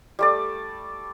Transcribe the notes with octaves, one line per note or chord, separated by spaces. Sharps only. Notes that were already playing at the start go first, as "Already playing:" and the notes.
G3 A3 D5